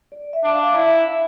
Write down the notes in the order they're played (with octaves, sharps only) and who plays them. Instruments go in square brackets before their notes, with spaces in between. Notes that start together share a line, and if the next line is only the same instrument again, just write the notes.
[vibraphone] D5
E5
[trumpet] D4
[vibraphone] F5
[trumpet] E4 [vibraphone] E5
[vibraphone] F5